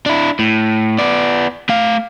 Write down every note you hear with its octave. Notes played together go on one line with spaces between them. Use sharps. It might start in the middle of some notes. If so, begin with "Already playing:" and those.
D4 E4
A2
B3 D5
A3 F5